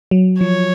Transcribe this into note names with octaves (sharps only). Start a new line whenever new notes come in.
F#3
F3 C#5